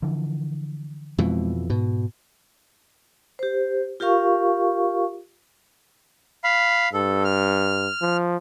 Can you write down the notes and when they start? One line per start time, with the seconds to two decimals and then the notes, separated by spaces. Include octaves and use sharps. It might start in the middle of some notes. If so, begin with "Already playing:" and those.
0.02 D3 E3 F3
1.18 F2 B2 E3 G#3 C4
1.70 G#2 B2
3.39 G4 C5
4.00 F4 G4 A#4 F5 C#6
6.44 F5 B5
6.93 G2 A4
7.25 F6
8.01 F3